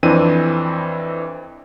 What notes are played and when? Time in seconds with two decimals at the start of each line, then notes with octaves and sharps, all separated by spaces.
0.03 F2 E3 C4 D4 D#7